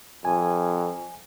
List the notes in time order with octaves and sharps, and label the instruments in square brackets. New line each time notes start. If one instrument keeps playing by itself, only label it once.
[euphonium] F2 [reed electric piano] G#5